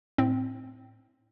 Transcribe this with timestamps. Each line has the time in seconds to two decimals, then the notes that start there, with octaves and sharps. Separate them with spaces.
0.18 A2 C4